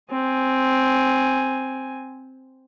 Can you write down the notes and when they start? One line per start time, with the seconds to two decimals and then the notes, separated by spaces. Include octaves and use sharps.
0.10 C4 G#5